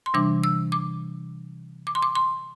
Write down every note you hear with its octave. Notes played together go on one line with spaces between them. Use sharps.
C6
C3 E3 G3 D4 D6
E6
D6
D6
C6
D6
C6